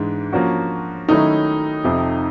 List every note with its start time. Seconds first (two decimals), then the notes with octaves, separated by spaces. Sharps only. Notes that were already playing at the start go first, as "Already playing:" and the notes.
Already playing: G#2 E3 G#3 D4
0.33 F3 A#3 C#4 F#4
1.08 D#3 F#3 A3 C#4 D#4 E4
1.84 F2 C3 F3